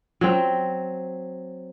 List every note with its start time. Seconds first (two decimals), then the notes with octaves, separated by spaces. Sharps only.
0.21 F#3 C4